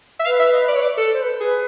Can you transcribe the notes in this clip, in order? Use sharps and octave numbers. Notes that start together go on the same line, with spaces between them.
E5
B4 F5
E5
D#5
D5
C#5
D5
A4
C5
B4
G#4 B4